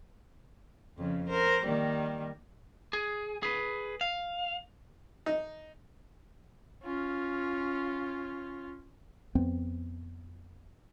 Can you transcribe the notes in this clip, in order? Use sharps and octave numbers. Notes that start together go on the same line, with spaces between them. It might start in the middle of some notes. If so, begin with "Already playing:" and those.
F2 C#3 F3
A#4 C5
D#3 G3 A#3
G#4
G#4 B4
F5
D#4
C#4 F4
F2 B3 C4